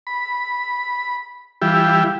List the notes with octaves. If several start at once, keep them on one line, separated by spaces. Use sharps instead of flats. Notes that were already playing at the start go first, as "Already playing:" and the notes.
B5
E3 G3 E4 F4 G4